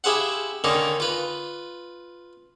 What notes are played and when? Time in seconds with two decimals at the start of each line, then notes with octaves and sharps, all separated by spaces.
0.04 E4 G4 G#4 C5 F5 F#5
0.64 D3 D#3 A#3 C#4 D#4 A#4
1.00 F4 B4